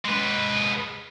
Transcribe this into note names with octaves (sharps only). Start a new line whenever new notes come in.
G#3 B4